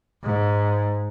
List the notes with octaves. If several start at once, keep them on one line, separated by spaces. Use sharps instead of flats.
G#2